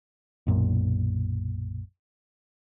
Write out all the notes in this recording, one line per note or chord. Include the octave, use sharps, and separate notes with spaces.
B1 F#2 A#2